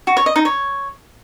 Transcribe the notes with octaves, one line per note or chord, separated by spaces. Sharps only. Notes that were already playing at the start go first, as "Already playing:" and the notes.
F#4
C#5
D#5
D#4
C#5